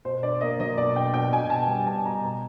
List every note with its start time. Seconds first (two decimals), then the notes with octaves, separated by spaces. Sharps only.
0.05 B2 C5
0.23 D4 D5
0.41 A#3 D#5
0.60 F#3 D#5
0.78 B2 D5
0.95 D4 G5
1.14 B2 G5
1.32 B2 G#5
1.50 B3 A5
1.68 G3
1.87 B2 A5
2.05 B2 A#5
2.23 A#5